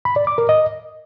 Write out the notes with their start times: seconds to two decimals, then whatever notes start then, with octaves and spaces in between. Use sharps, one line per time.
0.05 B5
0.16 D5
0.27 D6
0.38 A#4
0.49 D#5